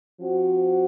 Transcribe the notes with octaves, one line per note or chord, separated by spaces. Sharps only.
F3 C4 F#4